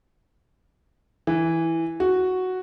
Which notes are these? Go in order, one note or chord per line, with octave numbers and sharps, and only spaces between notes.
E3
F#4